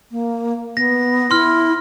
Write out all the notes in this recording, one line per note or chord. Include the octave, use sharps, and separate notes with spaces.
A#3
B3 A#6
E4 C6 F6